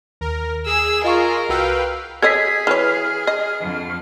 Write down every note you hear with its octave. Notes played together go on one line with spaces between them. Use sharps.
D#2 A#4
G#4 E6
F4 G#4 A#4 D#5 F5 C#6
C2 F#4 B4 F5 G5 E6
G#4 A4 C#5 D#5 G#6 B6
E3 B4 C#5 F6
D#5
F2 D3